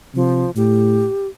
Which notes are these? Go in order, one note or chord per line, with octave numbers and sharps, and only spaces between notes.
C3 F3
A2 G4